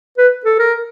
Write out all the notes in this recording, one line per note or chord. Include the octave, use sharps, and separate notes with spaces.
B4
A4
A#4